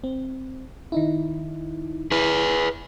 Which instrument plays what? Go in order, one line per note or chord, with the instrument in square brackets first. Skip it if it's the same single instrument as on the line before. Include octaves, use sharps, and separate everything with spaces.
[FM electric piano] C4
D#3 D#4 E4
[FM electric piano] E4 [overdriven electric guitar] G#4 B4